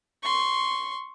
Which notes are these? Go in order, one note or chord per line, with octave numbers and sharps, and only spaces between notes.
C6 C#6